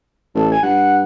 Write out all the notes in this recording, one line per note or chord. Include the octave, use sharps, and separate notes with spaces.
A1 A4
G#5
G2 F#5